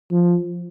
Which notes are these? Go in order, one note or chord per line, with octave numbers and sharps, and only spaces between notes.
F3